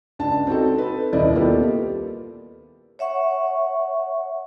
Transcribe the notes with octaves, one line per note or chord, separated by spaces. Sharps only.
C#2 D4 A5
C4 D#4 F#4 A4
A4 B4
D#1 C2 E4 D5 D#5
A#3 B3 F4 G4 A4
C#5 E5 F#5 C#6